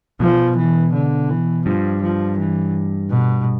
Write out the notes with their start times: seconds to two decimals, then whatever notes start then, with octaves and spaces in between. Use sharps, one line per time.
0.20 B2 F3
0.57 E3
0.93 D3
1.29 E3
1.65 G2 F3
2.02 F3
2.38 E3
3.10 B2